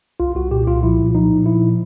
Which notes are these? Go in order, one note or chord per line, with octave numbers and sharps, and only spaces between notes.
C2 F4
C2 F#4
A#2 G4
C2 F4
F3 E4
A#2
F3 D#4
A#2
F3 E4